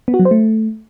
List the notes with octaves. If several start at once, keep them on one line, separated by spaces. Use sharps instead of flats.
B3
F#4
F#3
C5
A3